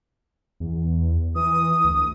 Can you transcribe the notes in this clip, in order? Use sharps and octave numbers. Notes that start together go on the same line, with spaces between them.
E2
E3 D#6
D2